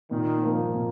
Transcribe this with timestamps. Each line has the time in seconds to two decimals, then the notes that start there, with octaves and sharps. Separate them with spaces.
0.11 A#2 D#3
0.42 F3 A#3
0.74 A#2